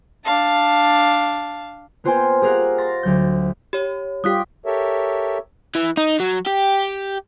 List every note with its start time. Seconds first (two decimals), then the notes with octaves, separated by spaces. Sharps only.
0.24 D4 F5 A5
2.04 A#3 B3 F4 C5 G5 G#5
2.42 G4 G#4 A#4 F5 F#5
2.78 C6 A6 A#6
3.03 D2 F#3 G6
3.73 G4 C#5
4.24 G3 F4 G4 D#6 F#6 B6
4.66 G4 A4 A#4 C#5 E5
5.75 E3
5.97 D#4
6.20 F#3
6.47 G4